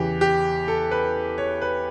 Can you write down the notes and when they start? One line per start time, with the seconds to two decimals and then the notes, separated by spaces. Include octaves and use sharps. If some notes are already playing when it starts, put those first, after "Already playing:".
Already playing: E2 C#3 E3 G4
0.21 G4
0.68 A4
0.91 B4
1.38 C#5
1.62 B4